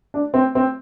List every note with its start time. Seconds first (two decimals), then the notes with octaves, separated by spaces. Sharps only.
0.14 D4
0.34 C4
0.55 C4